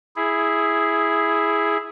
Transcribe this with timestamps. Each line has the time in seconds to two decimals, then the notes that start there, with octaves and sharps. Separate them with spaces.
0.16 E4 G#4